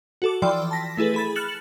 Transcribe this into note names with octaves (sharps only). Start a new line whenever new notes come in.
F#4 A4 D6
E3 F3 D5 G5 C6
A5 A#6 B6
A3 E4 G#4 A4 B4
G#4 B5 A6
F6 F#6 A6 C#7 E7 F#7